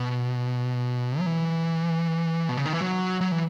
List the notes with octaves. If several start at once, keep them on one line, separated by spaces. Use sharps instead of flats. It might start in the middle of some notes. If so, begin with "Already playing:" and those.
Already playing: B2
F#3
E3
B2
C#3
D#3
E3
F#3
F#3
E3